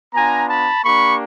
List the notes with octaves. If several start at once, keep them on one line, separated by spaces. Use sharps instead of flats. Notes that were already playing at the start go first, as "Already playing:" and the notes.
B3 D4 F4 G#5 A#5
A5 B5
A#3 D4 G4 B5 C#6